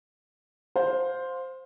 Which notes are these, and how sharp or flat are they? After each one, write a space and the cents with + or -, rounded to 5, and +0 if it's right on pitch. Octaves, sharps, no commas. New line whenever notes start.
C5 +0 F5 +25